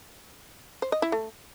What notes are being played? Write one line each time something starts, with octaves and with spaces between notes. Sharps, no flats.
C5
D#5
E4
A3